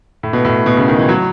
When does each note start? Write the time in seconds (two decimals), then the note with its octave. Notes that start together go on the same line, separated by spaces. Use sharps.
0.23 A2
0.33 B2
0.45 A2
0.66 B2
0.77 C#3
0.88 D#3
0.99 E3
1.09 F#3